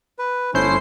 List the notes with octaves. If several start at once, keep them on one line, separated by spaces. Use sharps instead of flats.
B4
G1 A3 C#4 E4 C5 C7